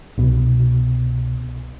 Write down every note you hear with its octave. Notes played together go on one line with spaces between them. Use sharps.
C2 B2